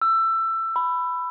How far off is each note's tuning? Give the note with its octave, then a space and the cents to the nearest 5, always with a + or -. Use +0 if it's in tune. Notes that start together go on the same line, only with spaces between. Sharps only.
E6 +20
B5 +10